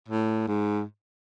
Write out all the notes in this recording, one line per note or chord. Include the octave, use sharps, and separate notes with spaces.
A2
G#2